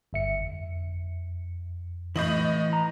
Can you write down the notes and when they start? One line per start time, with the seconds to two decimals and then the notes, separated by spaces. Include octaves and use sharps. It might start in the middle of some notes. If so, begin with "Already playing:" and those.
0.13 G1 E5 C#7
0.42 F2
2.16 A2 E3 D#5 F#7
2.73 A#5